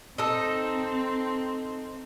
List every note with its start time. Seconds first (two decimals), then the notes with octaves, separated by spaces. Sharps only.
0.18 C4 D#4 A4